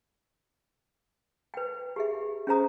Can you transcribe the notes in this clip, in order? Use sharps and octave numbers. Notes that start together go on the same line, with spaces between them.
B4 G5
G4 G#4 E5
C#4 G#4 C5 A#5 D#6